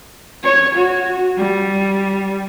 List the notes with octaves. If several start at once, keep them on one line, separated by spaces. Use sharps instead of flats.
C#5
F#4
G3